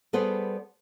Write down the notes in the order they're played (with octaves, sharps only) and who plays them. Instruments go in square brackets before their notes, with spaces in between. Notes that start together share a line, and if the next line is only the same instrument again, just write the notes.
[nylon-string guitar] G3 B3 G#4 A4 B4 C5